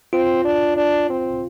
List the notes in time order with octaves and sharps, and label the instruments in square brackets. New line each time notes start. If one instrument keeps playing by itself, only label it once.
[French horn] C4 [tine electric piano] F4
[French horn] D4
D4
C4